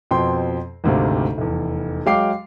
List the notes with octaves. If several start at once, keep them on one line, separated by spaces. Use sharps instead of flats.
F2 B2 C4 G5 C6
G#1 D2 C3 F5
F1 E2
F#3 G#3 F5 G5 D6 C7